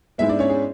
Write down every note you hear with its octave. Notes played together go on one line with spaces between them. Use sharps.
G#2 G#3 B3 E4 E5
D4 D5
C#4 C#5
G#4